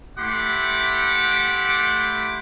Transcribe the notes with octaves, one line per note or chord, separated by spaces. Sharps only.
A3 E4 G4 F#5 C6 D6